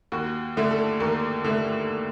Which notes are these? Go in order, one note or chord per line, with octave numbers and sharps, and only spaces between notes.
D#2 F#4
D3 A3
A4
D#2 A#4
D3 A3